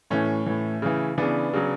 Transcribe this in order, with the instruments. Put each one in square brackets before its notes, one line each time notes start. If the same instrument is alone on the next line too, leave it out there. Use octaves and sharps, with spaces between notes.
[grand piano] A2 E3 A3 C#4
A2 E3
C#3 E3
C#3 E3 B3 D4
C#3 F#3